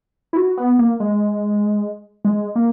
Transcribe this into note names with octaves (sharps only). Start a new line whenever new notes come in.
E4
F#4
B3
A#3
G#3
G#3
A#3